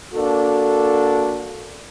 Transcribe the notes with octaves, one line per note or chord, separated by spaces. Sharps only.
A#3 D4 F#4 A4